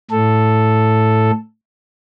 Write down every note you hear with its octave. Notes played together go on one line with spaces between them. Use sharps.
A2 A4